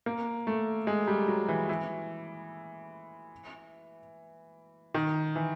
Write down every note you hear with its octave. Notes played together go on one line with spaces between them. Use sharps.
A#3
A3
G#3
G3
F#3
E3
E3
D#3
E3